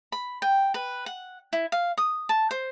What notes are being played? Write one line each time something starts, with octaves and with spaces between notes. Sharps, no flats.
B5
G5
B4
F#5
E4
F5
D#6
A5
C5